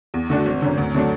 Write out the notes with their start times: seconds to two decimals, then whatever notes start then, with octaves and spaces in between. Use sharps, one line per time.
0.14 E2
0.30 D3 A3 D4 F#4
0.46 G#1
0.62 F#2 D3
0.78 D2
0.94 D3 F#3 A3 D4